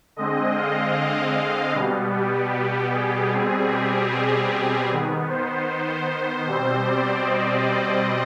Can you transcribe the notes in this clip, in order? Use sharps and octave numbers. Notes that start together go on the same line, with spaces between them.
D3 G#3 C4 D#5
F5
B2 G3 B3
G4
G4
G#4
B2 G3 C4
G4
G#4
D#3 B3
C5
C5
B2 G3 C4
D5
D#5